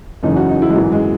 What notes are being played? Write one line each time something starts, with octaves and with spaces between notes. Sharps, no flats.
F#1 E2 C#3 E3 D#4
F#4
D#4
E4
G#3
G#1 F#2 E3 F#3
G#3